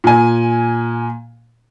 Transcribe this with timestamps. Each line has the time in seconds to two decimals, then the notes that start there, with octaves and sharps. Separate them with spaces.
0.04 A#2 G#5